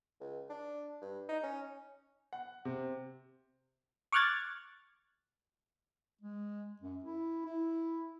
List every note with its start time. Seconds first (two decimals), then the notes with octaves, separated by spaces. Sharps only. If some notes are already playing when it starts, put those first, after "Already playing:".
0.20 C#2
0.50 D4
1.02 G2
1.29 D#4
1.44 C#4
2.33 F#5
2.65 C3
4.12 C#6 D6 F6 F#6 G#6 A6
6.21 G#3
6.81 F#2
7.04 E4
7.46 E4